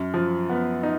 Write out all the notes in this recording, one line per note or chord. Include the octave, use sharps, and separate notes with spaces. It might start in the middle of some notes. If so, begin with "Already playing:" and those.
Already playing: F#2
F3
B3
D#4